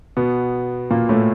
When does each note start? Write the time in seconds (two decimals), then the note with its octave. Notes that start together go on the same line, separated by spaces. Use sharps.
0.17 B2 B3
0.91 A#2 A#3
1.09 A2 A3